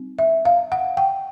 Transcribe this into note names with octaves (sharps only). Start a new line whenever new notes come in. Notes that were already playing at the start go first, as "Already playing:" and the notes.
Already playing: G3 C4 D#4
E5
F5
F#5
G5